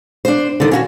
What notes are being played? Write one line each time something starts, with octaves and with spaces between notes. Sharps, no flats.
D4 C5
D3 D#3
C#4 F4 F#4